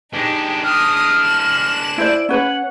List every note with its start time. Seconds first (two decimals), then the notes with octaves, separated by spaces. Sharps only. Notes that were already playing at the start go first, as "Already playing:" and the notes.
0.13 G#3 D4 D#4 G4
0.64 D#6 F6
1.24 F#6 E7
1.98 E4 C5 D5 D7
2.29 C#4 B4 C#5 F#5